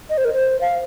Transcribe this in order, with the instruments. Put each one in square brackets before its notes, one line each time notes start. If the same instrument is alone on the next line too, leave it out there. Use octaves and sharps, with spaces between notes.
[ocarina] D#5
C5
A#4
C5
F5